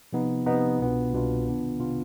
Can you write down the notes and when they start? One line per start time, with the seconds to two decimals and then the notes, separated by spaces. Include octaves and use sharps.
0.13 C3 F3 B3 D#4
0.46 C3 F3 B3 D#4
0.79 C2 B2 B3 D4 F4
1.13 C2 B2 B3 D4 F4
1.46 C3 D#3 B3 D4 F4
1.79 C3 D#3 B3 D4 F4